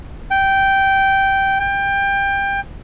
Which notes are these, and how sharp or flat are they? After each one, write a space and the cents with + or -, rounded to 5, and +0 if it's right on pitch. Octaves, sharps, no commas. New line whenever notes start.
G5 -10
G5 +20